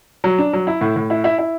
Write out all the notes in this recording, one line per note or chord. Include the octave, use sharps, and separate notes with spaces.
F#3
D4
F#3
E4
A2
A2
E4
E4
E4